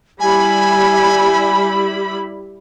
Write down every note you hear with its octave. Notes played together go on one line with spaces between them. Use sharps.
G3 E4 G#5 B5